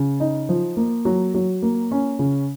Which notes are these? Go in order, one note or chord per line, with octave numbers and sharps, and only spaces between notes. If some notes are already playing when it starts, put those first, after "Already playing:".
Already playing: C#3
D#4
F3
A#3
F#3
F#3
A#3
C#4
C#3